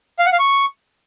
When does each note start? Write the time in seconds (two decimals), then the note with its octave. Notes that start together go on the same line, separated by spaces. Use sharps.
0.19 F5
0.26 F#5
0.32 F5
0.39 C#6